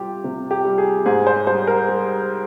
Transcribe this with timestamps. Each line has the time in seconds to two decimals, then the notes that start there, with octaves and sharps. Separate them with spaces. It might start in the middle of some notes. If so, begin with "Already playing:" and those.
Already playing: C3 G3 F4 G4
0.24 C3
0.51 G4
0.64 G3
0.78 G#4
1.06 G#2 G#4
1.27 C5
1.47 G3 C5
1.67 A#4
1.88 G3